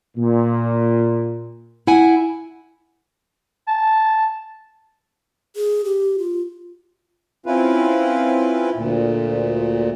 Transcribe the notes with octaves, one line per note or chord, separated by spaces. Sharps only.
A#2
E4 F#5 G#5
A5
G#4
G4
F4
C4 C#4 E4 F4 B4
D2 A#2